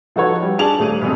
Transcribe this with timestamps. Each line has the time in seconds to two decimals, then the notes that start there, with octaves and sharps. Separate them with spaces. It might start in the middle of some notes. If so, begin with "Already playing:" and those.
0.16 F3 D#4 F#4 A4 B4 C#5
0.42 G3
0.58 D4 G#4 A5 F7 F#7
0.79 D#1 A3 D#7
1.02 E1 F2